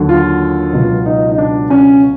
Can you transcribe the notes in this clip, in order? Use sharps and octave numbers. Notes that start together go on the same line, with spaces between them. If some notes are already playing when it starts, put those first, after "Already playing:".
Already playing: D#2 D3 F#3
F4
C#2 B2 F#3
D#4
D#4
D4
C#4